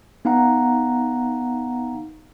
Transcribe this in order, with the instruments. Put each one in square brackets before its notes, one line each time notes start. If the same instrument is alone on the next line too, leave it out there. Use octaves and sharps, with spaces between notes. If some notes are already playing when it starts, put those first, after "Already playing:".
[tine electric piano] B3 D#4 F5 F#5 A#5